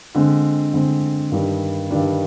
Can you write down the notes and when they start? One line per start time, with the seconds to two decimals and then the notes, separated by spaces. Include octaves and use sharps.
0.15 D3 G#3 C4
0.73 D3 G#3 C4
1.31 G2 D#3 G3 D4
1.91 G2 D#3 G3 D4